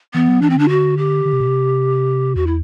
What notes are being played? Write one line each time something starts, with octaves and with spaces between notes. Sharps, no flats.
E3 B3
F#3
E3 D4
C4
D3 D4
F#4
G4
D3
C3
B2
C3
E2 F#4
E4